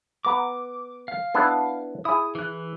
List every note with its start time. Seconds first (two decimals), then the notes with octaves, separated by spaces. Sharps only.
0.25 B3 A#5 D6
1.08 F5
1.35 B3 D4 E4
2.05 E4 G#4 D#6
2.35 E3 F#6